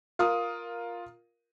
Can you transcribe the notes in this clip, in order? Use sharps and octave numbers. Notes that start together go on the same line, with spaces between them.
F4 A#4 D#6